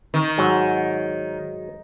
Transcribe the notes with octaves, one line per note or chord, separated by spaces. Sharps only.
D#3
G#2 F#3